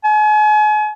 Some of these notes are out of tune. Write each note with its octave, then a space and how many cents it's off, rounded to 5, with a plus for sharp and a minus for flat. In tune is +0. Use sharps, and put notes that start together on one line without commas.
G#5 +40